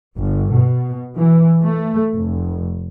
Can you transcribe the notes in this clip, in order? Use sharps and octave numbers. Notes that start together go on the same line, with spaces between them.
G1
B2
E3
A3
F1